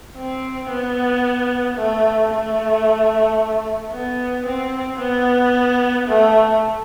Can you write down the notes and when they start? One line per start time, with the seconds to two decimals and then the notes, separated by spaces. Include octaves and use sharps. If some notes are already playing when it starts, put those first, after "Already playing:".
0.16 C4
0.70 B3
1.77 A3
2.31 A3
3.92 B3
4.46 C4
5.00 B3
6.08 A3